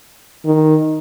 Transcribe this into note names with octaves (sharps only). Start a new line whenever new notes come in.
D#3